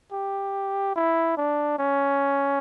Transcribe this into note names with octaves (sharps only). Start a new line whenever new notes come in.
G4
E4
D4
C#4